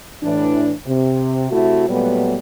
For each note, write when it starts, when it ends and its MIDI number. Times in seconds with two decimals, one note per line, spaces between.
0.22 0.72 45
0.22 0.72 52
0.22 0.72 62
0.86 1.46 48
1.51 1.85 48
1.51 1.85 57
1.51 1.85 64
1.51 1.85 66
1.88 2.37 46
1.88 2.37 54
1.88 2.37 55
1.88 2.37 57
1.88 2.37 59